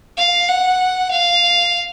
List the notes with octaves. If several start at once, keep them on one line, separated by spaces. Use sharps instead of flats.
F5
F#5
F5